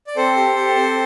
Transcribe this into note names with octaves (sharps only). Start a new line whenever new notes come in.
D5
C4 A4 C5
G4
G4
C4